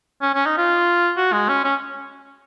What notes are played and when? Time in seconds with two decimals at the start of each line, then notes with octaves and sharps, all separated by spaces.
0.22 C#4
0.34 C#4
0.46 D#4
0.57 F4
1.17 F#4
1.33 G#3
1.49 C#4
1.64 C#4